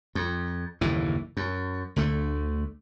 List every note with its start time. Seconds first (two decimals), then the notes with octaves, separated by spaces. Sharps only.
0.15 F2
0.81 F#1 D#2 A2 E3
1.37 F#2
1.96 D2 D3 A3